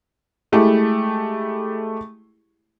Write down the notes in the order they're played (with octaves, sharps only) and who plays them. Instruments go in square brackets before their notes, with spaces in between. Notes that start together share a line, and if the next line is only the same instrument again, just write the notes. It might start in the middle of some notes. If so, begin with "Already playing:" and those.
[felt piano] G#3 A3 E4 G4